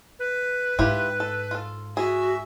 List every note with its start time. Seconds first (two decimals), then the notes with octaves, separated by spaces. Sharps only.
0.19 B4
0.79 G#2 E4 F4 G4
1.20 A4
1.51 F4 A4
1.97 F#4 G#4 E5